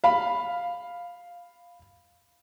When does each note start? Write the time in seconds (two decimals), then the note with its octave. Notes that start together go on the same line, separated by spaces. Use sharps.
0.04 F5 B5